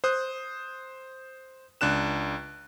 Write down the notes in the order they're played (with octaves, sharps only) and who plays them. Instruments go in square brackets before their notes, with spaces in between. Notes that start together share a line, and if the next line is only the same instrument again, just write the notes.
[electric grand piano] C5 D#6 F#6
C#2 D4 F#6 E7